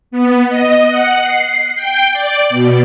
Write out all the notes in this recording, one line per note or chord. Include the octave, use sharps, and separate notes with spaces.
B3
D#5
F#5
C7
G5
D5
B2